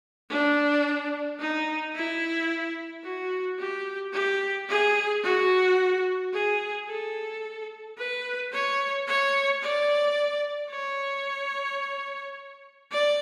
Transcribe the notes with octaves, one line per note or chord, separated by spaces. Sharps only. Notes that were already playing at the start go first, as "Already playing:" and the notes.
D4
D#4
E4
F#4
G4
G4
G#4
F#4
G#4
A4
B4
C#5
C#5
D5
C#5
D5